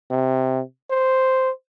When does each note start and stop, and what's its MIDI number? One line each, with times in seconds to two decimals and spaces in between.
0.11 0.61 48
0.91 1.50 72